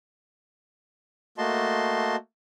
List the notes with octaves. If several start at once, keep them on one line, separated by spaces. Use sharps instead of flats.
A3 A#3 F#4 D#5 A5 C6